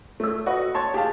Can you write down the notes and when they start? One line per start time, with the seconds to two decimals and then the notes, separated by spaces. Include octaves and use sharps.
0.20 A3 E6
0.46 F#4 B4 D#5 F#5
0.74 C#5 A5 C6
0.94 G4 G#4 F5 A5